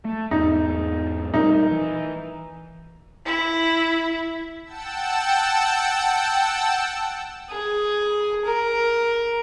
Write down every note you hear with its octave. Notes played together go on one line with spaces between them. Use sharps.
A3
E2 G#2 D#4
A#2 G3 A3 D#4 A#4
E3
E4
F#5 G5 A5 E6
G#4
A#4